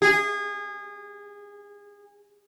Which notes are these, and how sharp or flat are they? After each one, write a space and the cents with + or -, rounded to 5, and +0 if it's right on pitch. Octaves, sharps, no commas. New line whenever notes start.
G#4 -25